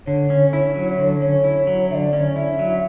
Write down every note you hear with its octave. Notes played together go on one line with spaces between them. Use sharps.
D3 C#5
C#4
E4
F#3
D3
C#4
E4
F#3
D3 D5 E5
C#4
E4 E5
F#3